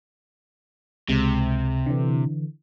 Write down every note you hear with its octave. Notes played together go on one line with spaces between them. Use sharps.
C#2 C3 G#3
D3 E3